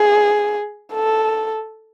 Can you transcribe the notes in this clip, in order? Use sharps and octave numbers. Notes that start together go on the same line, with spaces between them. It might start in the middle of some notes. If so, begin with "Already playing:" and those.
Already playing: G#4
A4